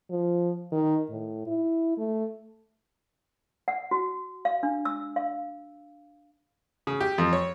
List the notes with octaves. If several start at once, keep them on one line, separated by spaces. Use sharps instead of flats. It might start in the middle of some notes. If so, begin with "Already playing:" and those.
F3
D#3
A2
E4
A3
F#5
F#4
F5
D4
E6
F5
C#3
G4
F2
C#5